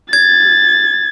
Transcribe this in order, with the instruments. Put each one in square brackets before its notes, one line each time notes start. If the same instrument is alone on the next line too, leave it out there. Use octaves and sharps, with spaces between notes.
[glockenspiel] G#6 [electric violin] A6